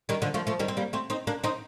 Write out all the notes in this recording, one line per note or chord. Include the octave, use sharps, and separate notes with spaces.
D#3 G3
D3 F3
F3 A3
F3 A3
D#3 G3
C4
G3 A#3
A3 C4
C4 D#4
A#3 D4
C4 D#4